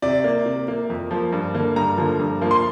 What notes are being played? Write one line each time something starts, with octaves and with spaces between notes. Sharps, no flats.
C3 D5
A#3
C3
A#3
F2
F3 A#3
G2
D3 A#3
G2 A#5
D3 F3 A#3
G2
F3 A#3
C6